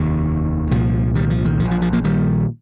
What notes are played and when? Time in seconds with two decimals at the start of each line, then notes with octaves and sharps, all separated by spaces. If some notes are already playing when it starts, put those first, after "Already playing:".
Already playing: F1 D#2 D#3
0.71 C2 A#2 F3
1.15 D#3 G3
1.30 F3
1.45 D#3
1.60 A#2 F3
1.64 A#1
1.71 F3
1.82 F3
1.93 F3 A#3
2.04 D#3 G3